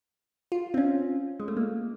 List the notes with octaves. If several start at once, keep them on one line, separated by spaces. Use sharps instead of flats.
F4
C4
C#4
G#3
A3
A#3